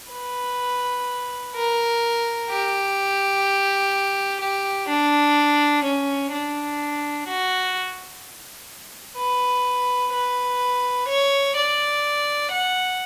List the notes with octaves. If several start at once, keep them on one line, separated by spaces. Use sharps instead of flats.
B4
A#4
G4
G4
D4
C#4
D4
F#4
B4
B4
C#5
D5
F#5